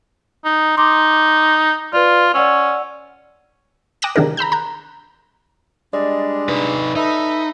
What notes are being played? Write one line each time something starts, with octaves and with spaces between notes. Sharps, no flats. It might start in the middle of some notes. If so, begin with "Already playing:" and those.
D#4
D#4 C6 D6
F4 B4 D5
C#4 D5 F#5 E6
G5 D6 D#6 F#6 A#6 E7
C3 D#3 D4 D#4 G#4 A#4
A#5 B5 E6 G6
A#5 F#6 G6
G3 G#3 D4 D5 D#5
D#4 B4
D#4 A4 B4 E5